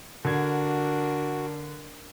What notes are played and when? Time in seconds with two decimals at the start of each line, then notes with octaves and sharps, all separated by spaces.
0.25 D3 D4 F#4 A#4 G#6